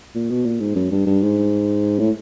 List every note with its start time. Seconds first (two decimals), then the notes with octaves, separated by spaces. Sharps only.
0.15 A#2
0.30 B2
0.45 A#2
0.60 G#2
0.76 F#2
0.91 G2
1.06 G2
1.23 G#2
1.99 A2